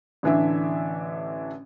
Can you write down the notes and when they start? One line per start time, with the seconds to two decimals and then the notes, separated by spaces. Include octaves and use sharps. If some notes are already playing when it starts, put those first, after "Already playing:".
0.23 A1 D3 E3 D4 E5